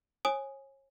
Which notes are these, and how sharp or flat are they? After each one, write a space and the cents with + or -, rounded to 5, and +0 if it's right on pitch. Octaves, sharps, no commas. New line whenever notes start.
C#5 -35 G#5 +0 D#6 +0